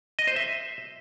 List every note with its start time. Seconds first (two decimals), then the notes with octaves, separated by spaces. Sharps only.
0.19 D#5
0.27 C5
0.36 E5